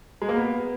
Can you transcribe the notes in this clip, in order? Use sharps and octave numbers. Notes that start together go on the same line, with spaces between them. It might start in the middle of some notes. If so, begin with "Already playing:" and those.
G#3
A#3
B3